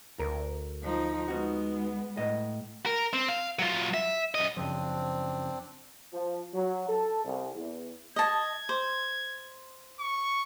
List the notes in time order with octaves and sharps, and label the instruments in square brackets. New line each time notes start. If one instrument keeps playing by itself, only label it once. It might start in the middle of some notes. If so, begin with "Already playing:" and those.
[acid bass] D2 [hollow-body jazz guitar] A#4
[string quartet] F3 D#4
[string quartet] G#3 B3 [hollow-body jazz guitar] D#4 F#4
[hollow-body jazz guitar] A2 D#5
[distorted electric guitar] A#4
C4
F5
F#3 F4
E5
F#2 D#5
[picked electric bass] F#2 C#3 F3 [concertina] C4 D4
[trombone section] F3
F#3
A4
C2
E2
[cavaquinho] D#5 A5 [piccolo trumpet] G#6
[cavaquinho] C5
[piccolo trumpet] C#6